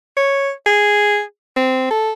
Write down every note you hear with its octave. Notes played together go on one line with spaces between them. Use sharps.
C#5
G#4
C4
A4